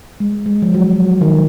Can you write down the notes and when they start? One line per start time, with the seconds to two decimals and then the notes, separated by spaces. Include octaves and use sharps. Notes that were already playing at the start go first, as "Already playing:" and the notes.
0.20 G#3
0.46 G#3
0.62 F3
0.74 F#3
1.00 F#3
1.21 D#3